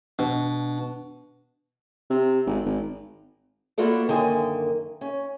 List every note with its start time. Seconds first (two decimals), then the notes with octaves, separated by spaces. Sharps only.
0.19 B2 D4
2.11 C3
2.47 G#1
2.65 G#1
3.78 A#3 B3 F4 F#4 A4 D5
4.09 F#2 D3 D#3 A#3 D#5 G#5
5.01 C#4